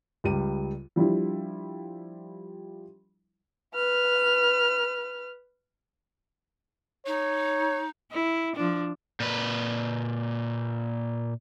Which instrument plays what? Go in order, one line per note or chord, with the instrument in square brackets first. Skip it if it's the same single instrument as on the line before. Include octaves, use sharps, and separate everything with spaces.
[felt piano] C#2 G3 D#7
[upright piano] F3 G3 D4 E4
[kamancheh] B4 F6
[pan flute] D#4 [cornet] C#5
[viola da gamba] E4
F3 D4
[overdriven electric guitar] A#2 B4